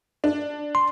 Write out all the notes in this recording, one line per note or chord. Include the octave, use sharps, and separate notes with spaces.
D4
C6